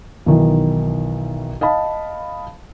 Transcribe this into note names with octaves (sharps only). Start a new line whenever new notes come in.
B1 D#3 E3
D#5 F5 A5 B5